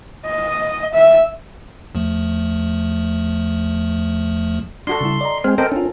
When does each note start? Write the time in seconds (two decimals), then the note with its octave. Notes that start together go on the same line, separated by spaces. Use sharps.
0.26 D#5
0.93 E5
1.95 E2 F3 A3
4.87 D4 F#4 A4 C6
5.01 C#3 G3 E4
5.21 D5 D#5 A#5
5.44 G#3 C4 C5 G#5 F6
5.58 C4 A4 A#4 C5 D#5 G5
5.72 C#4 D4 F4